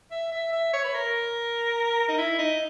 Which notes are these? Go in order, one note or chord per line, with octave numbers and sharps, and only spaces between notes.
E5
E5
E5
C#5
B4
A#4
D#4
E4
D#4